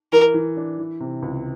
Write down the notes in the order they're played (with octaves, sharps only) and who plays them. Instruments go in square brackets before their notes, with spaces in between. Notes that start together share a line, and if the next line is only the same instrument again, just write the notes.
[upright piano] E3 [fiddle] A#4
[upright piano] E3
D4
E3
C3
C#2